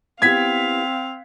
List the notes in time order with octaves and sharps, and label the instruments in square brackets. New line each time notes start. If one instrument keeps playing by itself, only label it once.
[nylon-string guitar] B3 E4 G4 [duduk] C4 [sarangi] F5 [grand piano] G#6 B6